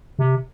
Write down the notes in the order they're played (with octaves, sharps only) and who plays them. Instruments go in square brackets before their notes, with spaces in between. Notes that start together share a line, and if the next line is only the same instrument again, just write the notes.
[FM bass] C3